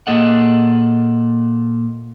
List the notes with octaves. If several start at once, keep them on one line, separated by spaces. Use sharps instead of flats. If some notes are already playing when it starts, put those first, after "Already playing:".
A#2 A#3 G#4 A4 D#5 F#5